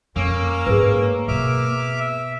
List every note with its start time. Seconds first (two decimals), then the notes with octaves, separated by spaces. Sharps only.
0.16 F2 A#3 C#4 E6
0.67 G#2 A3 G#4 B4
1.28 B2 B3 E5 D6 F6
2.00 E5